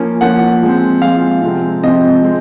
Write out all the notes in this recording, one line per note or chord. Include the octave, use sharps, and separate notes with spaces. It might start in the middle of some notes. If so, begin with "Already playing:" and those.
Already playing: F3 A#3 C#4
F3 A#3 C#4 F#5
F3 G#3 C4
F3 G#3 C4 F5
C3 F3 G#3 C4
C3 F3 G#3 C4 D#5
G#3 C4